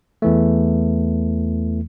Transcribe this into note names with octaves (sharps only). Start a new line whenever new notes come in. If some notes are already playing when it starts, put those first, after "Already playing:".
E2 E3 A3